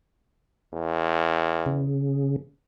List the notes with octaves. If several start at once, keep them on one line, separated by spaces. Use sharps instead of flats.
E2
C#3